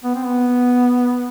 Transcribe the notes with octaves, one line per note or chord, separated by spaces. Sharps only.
B3
C4
B3